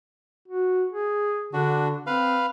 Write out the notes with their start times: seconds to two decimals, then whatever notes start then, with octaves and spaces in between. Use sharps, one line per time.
0.48 F#4
0.93 G#4
1.53 D3 D4 F#4
2.07 C4 B4 F5